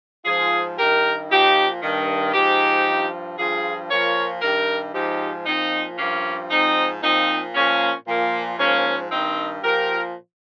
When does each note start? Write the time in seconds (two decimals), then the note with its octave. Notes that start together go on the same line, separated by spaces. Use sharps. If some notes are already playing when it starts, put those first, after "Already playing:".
0.25 G#2 F3 F4 G#4
0.77 G2 D#3 G4 A#4
1.29 A#2 F3 D#4 G4
1.81 G2 D#3
2.33 G#2 F3 D#4 G4
2.86 G2 F3
3.38 G2 F3 F4 G#4
3.90 A#2 F3 A#4 C#5
4.42 G2 D#3 G4 A#4
4.93 G#2 F3 D#4 G4
5.46 A#2 F3 C4 D#4
5.98 G2 F3 A#3 C#4
6.50 G#2 F3 C4 D#4
7.02 A#2 F3 C4 D#4
7.54 A#2 F3 A#3 C#4
8.07 A#2 F3 A#3
8.58 G#2 F3 A#3 C#4
9.11 G2 D#3 C4 D#4
9.62 A#2 F3 G4 A#4